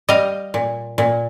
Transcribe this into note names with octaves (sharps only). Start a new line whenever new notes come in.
G3 D#5 F5
A#2
A#2